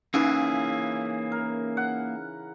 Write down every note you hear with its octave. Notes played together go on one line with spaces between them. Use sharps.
C#3 E3 A#3 C#4 D#4 E4 G#4
A#4
F#5